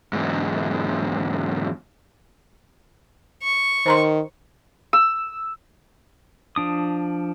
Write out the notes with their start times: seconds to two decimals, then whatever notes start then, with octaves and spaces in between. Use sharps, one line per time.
0.13 E2 G#2
3.43 C#6
3.86 D#3 C5 A#5 C6
4.93 E6
6.56 F3 D4 D#6